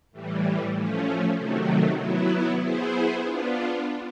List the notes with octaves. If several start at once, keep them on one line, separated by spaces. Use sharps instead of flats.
A2 E3 G3
F3 A3 C#4
C3 D#3 F#3 A3
F#3 B3 E4
B3 E4 G#4 C5
B3 D4 F4